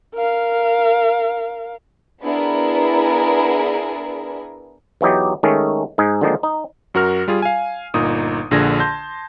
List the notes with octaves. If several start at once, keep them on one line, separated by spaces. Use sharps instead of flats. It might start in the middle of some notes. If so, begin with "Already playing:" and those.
A#4 F5
B3 D4 E4 G#4 A#4
E2 E3 F#3 D#4 G4
D#3 G#3 A3 C#4 D#4
G#2 D#4 G#4
D3 D#3 F3 G#3 A#3 D#4
D#4
F#2 F#4 A#4 F6
G3 F4 G#4
F5 G#5
G1 A#2 D#4 D#6
A#1 A#2 D3 G#4 G#6 A#6
A5 C6 G6